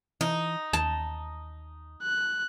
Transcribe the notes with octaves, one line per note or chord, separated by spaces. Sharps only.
E3 D#4
D#2 A5
F#6